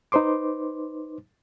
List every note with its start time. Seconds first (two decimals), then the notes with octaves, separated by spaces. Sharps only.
0.12 D#4 B4 C5 C6 D6